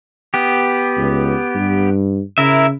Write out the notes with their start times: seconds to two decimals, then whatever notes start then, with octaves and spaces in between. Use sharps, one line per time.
0.34 B3 G4
0.97 C#2
1.55 G2
2.38 C#3 E4 A#4 E5